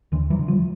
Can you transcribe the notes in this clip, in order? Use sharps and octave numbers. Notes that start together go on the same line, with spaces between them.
D#2 D3 E3
E3 F#3
D3
F3 G3